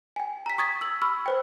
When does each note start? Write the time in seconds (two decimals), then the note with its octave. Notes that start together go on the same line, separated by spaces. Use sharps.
0.16 G5 G#5
0.46 A#5 B6
0.58 C#6 D#6 G#6 A6 B6
0.81 E6 F#7
1.02 B5 C#6 E6 F6
1.26 B4 C5 G5